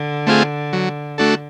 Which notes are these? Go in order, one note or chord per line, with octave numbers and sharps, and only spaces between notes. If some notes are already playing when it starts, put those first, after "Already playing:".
Already playing: D3
A3 C4 F4 G#4
F#3
A3 D4 F#4 A4